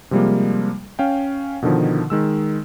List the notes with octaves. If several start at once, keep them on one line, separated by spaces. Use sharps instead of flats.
C3 F3 G3 G#3 A#3
C#4 F5 G5
B2 D3 D#3 F3
D#3 G#3 E6